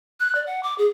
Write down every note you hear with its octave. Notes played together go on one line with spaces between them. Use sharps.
F#6
D5
F#5
D6
G#4